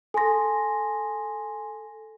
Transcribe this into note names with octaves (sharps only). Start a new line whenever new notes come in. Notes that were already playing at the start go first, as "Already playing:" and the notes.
A4 G#5 C6 A#6